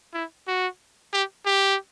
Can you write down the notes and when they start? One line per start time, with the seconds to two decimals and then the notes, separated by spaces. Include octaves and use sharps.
0.14 E4
0.48 F#4
1.13 G4
1.46 G4